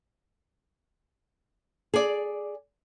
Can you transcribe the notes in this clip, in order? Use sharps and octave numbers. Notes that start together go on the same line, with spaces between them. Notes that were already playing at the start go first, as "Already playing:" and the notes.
G#4 D5